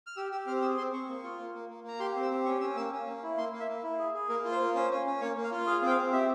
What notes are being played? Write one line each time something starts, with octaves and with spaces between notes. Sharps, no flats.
F6
G4 E6
G4 E6
C4 F6
G#4 E6
C4 C6
C4 C#6
A#3
F4
A#3
A#3
A#3
A#3 A#5
G4 C6
C4
E6
G4
C#4 C#6
C#4 E6
A#3 E6
C#4
A#3
E4
A#3 C6
A#3
E5
A#3
E4
G#4
G#4
A#3 A#4
F4
C5
A#3
C#4 C5
C#4
C#4
A#3 C#5
A#3
F5
F4
G#4 F5
C4 G5
F5
C4
G4 E5